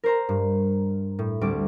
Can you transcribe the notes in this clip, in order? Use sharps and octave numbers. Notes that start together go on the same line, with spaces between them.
A#4 C5 A#5
G2
A2
D2 G3 C4 D6